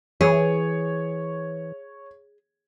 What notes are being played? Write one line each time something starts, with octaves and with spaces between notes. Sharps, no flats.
E3 G#4 C#5